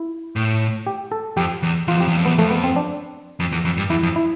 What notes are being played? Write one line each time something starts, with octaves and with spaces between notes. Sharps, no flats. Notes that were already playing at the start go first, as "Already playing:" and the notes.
Already playing: E4
A2
G4
A4
F2 G4
E2
E2 F4
F2 G4
E2
F2
E2 B3
F2 A3
B3
C4
D4
F2
E2
F2
G2
E2 E4
F2
E4